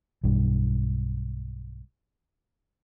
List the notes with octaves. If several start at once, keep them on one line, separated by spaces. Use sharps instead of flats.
B1 G2